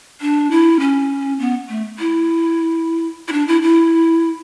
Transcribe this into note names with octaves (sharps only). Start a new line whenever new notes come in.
D4
E4
C#4
B3
A3
E4
E4
D4
E4
E4